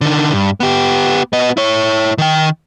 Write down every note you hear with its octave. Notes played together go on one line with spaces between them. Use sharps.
D3 D#3
G2
B3 G4
B3 D#5
E4 C#5
D#3 G5